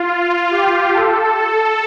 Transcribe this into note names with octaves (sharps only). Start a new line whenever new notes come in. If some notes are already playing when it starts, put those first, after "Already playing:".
Already playing: F4
G4
A4